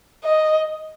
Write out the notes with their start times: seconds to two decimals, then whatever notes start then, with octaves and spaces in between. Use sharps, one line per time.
0.24 D#5